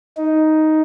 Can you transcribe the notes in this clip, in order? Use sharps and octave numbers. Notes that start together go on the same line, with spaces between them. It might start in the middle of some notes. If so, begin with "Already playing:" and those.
D#4